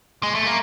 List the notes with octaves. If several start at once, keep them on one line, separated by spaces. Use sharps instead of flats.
G#3
A3
A#3